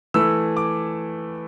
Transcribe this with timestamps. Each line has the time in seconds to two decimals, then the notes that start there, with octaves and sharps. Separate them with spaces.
0.14 E3 A3 E4 E6
0.57 D6